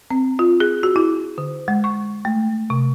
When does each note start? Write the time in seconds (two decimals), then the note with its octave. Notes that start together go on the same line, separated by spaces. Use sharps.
0.11 C4
0.39 F4
0.60 G#4
0.83 F#4
0.96 E4
1.38 D3
1.68 G#3
1.84 C#6
2.25 A3
2.70 C3